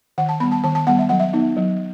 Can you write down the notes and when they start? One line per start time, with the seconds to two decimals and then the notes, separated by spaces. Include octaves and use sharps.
0.18 D#3 F#5
0.29 A5
0.40 G3 B3 B5
0.52 A5
0.64 D#3 A5
0.75 A5
0.87 G3 B3 F#5
0.99 E5
1.09 F#3 F#5
1.19 E5
1.33 B3 D#4
1.57 F#3